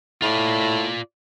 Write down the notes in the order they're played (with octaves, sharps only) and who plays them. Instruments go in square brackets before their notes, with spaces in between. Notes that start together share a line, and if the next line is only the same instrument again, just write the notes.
[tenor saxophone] A2 [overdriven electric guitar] F4 D5